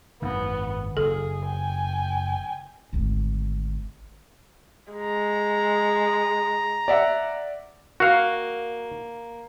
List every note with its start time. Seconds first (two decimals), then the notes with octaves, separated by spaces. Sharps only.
0.22 G#1 F#2 B3
0.97 F#1 G#4 A4
1.45 G5 G#5
2.93 G#1 D2
4.93 G#3 A#5
6.88 D5 E5 F#5
8.00 A#3 F#4 F5